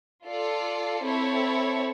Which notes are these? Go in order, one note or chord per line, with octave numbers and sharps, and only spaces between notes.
F4 A4 D5
C4 E4 A4 C#5